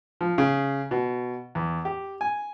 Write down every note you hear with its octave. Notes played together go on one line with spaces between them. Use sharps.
F3
C#3
B2
E2
G4
G#5